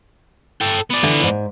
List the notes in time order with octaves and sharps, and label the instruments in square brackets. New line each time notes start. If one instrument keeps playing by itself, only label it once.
[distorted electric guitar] A4 G5
B3 D5
[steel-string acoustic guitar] D3 E3 E4
G#2